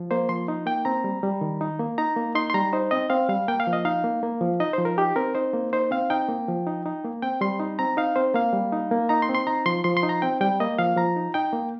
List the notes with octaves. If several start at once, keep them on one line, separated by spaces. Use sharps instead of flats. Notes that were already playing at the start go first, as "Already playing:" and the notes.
Already playing: F3
A#3 C5
F3 C6
D#4
A#3 G5
C4 A#5
G3
G3
D#3
D#4
A#3
D#4 A#5
A#3
D#4 C6
C6
G3 A#5
D#4 C5
C4 D#5
C4 F5
G3 F5
A#3 G5
F5
F3
D#5
D#4 F5
A#3
A#3
F3
D#4 D#5
C5
F3
A#4
D#4 G4
C4 A#4
D#4 C5
A#3
D#4 C5
C4 F5
D#4 G5
A#3
F3
D#4
D#4
A#3
C4 G5
G3 C6
D#4
C4 A#5
D#4 F5
C4 C5
A#3 F5
G3
D#4
A#3
D#4 A#5
C6
C4
C6
D#4 A#5
F3 C6
F3 C6
C6
D#4
A#5
C4 G5
G3 G5
A#3 D#5
F3 F5
F3 A#5
D#4
D#4 G5
A#3